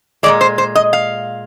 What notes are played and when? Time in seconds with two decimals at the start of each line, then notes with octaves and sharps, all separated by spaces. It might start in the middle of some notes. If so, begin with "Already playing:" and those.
0.23 A#2 F3 G#3 D5
0.41 C5
0.58 C5
0.75 D#5
0.93 F5